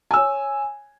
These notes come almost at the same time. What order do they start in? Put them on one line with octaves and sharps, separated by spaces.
G#5 E6 C#5